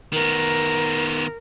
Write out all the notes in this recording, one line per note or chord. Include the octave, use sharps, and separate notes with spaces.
D#3 B3 A#4